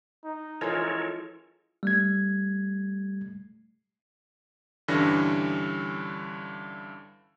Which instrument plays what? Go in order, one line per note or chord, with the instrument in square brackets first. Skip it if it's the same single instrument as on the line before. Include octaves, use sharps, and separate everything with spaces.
[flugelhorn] D#4
[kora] E3 F3 [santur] G#3 C#4 F4 [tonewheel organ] A4 A#4 C#5
[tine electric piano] G3 A3 G#6
[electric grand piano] G2 D3 E3 G3 C#4 A#6